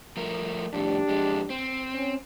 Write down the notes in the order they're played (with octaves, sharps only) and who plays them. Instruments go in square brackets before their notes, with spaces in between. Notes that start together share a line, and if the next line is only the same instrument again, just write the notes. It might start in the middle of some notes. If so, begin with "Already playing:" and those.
[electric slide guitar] F3 A3 A#4
[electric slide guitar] F2 A2 [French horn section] D4 G4
[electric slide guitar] F2 G#3
C4
[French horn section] C#4